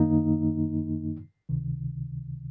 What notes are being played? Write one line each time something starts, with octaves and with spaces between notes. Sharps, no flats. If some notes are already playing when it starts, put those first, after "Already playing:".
Already playing: F#2 D#3 A#3 D#4
C#2 C3 D#3